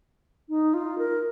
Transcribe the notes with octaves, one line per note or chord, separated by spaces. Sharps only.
D#4
F4
A#4